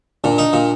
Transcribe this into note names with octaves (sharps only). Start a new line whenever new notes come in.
A#2 D4
D#4
A#2